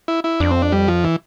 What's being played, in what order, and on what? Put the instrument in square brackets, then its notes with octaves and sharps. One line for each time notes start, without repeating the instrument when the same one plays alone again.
[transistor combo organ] E4
E4
[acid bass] F2 [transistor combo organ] D4
[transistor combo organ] C4
D4
G3
F3
E3